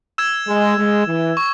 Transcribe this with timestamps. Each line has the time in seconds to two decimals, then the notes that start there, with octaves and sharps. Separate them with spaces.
0.18 E6 G#6 E7
0.47 G#3
0.78 G#3
1.07 E3
1.37 C#6